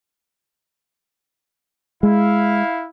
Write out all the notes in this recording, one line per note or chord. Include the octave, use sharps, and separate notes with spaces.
G#3 E4 F5